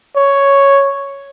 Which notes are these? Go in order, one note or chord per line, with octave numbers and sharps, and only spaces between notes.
C#5